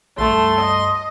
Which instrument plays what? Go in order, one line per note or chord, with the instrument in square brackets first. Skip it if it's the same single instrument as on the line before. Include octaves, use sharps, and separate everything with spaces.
[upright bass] C#2 G2 [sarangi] A3 [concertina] C6
[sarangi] D#5